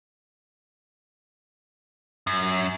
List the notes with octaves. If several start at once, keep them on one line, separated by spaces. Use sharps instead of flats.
F#2